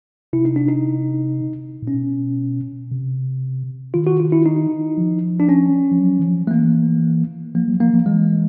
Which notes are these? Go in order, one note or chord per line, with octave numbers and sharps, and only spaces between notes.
C3 E4
D#4
D4
D#4
A#2
B2 C#4
C3
D#3 F4
F#4
F4
E4
D#4
F3
D4
C#4
F3
F#3
E3
F3
A3
E3 A#3
F3 A#3
F#3
F3 A#3
F3
E3 G#3